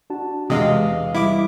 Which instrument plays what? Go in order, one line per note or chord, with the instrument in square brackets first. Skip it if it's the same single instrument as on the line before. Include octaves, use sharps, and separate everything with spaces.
[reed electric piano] D4 F#4 A5
[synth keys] E2 D#5 F5 [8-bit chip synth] C3 G#3 [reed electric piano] D#6
[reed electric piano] G3 [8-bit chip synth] E4 D6